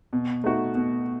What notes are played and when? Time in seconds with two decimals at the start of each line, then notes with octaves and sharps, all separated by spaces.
0.13 B2
0.44 A3 D#4 F#4
0.75 B2